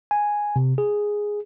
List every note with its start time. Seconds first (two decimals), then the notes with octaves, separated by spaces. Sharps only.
0.11 G#5
0.56 C3
0.78 G#4